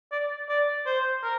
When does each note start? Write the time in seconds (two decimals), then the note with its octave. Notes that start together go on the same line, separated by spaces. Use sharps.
0.12 D5
0.49 D5
0.86 C5
1.23 A#4